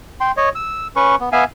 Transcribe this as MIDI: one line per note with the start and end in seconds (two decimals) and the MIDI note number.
0.21 0.32 79
0.21 0.32 84
0.37 0.49 73
0.37 0.49 75
0.55 0.87 88
0.96 1.16 61
0.96 1.16 71
0.96 1.16 85
1.20 1.29 59
1.32 1.44 59
1.32 1.44 76
1.32 1.44 77
1.32 1.44 80